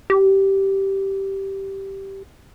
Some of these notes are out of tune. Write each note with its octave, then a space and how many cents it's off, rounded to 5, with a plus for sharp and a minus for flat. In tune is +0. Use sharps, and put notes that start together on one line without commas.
G4 -10